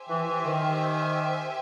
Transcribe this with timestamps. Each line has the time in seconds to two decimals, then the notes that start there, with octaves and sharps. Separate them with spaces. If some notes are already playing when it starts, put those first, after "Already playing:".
Already playing: G4 C5 E5 G#5
0.09 E3
0.27 E3
0.45 D#3